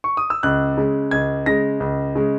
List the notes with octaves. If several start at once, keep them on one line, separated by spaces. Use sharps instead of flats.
C#6
D#6
E6
C#2 F#6
C#3 G#3
C#2 G#6
C#3 G#3 A#6
C#2
C#3 G#3